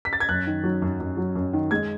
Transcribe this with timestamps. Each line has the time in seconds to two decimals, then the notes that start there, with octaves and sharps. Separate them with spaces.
0.05 B6
0.13 A6
0.20 G#6
0.29 F#2 F#6
0.47 D#3
0.64 F#3
0.82 F#2
1.00 F#2
1.17 F#3
1.35 F#2
1.53 D#3
1.71 G#3 G#6